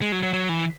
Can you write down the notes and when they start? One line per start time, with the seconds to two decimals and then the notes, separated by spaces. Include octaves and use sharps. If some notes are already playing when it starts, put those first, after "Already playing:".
0.02 G#3
0.12 F#3
0.23 F#3
0.33 F#3
0.49 E3